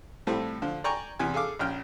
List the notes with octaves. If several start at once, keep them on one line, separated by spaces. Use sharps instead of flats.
A2 F3 G3 A3 C4
D3 F3
D5 G5 G#5 A#5 C#6
E2 C3 G#5
G#4 A4 F5 D6
A#1 C#4 G5 F6